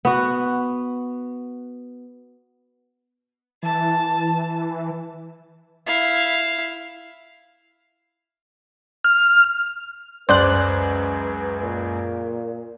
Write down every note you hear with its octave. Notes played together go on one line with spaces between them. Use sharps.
B3 F#4
E3 A5
E4 F5
F6
C#2 F#2 B4 C5 D5 F#6
A#2